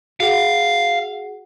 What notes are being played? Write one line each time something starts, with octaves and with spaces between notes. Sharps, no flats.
F#4 G#4 F5 F#5